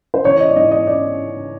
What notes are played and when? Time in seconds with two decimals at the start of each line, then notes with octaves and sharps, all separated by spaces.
0.14 C5
0.25 A1 C#5
0.40 D#5
0.49 D5
0.56 G#2 E3 D#5
0.71 D#5
0.87 D5